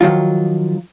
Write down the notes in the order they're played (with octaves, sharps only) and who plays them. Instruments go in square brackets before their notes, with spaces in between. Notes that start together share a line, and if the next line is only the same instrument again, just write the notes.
[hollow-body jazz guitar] D#3 F3 F#3 F4